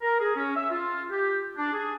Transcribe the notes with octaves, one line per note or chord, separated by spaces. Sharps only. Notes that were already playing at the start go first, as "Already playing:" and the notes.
A#4
G#4
C#4
E5
F4
G4
D4
G#4